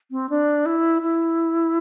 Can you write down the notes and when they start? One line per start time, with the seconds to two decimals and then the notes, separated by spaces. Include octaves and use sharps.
0.11 C4
0.30 D4
0.66 E4
1.02 E4